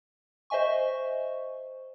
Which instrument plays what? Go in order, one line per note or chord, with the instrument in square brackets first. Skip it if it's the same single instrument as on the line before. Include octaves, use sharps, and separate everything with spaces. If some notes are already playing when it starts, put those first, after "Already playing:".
[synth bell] C5 D#5 E5 G#5 C#6